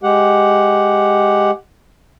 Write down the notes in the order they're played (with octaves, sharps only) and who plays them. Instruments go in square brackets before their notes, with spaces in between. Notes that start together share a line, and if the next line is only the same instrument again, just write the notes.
[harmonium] G#3 G4 F#5